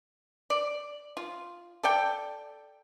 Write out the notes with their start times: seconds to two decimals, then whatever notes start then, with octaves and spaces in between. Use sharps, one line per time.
0.50 D5
1.17 F4
1.83 A4 D5 G5